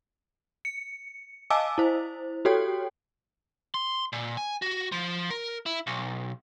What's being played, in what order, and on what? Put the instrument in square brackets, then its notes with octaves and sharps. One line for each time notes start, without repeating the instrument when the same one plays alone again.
[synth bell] C#7
D#5 F5 G#5 A5 D6 E6
E4 C5
F#4 G4 A4 C#5 G5
[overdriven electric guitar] C6
A#2
G#5
F#4
F3
A#4
E4
B1